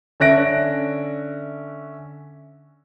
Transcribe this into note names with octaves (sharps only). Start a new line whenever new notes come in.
D3 C#4 E5 F#6 A#6 D7